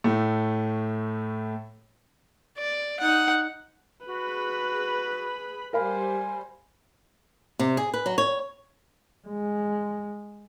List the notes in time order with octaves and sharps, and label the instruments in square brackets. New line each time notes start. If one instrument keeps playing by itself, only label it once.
[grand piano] A2 A3
[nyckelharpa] D5
D#4 F#5
[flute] F#4 [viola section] G#4 B5 [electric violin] B4
[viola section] G3 C5 [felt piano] A#4 F5 B5 [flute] G#5
[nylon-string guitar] C3
G#4
B4
F#3
C#5
[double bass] G#3